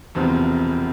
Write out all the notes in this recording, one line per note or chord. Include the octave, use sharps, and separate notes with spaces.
E1 E2 C3 F3 C4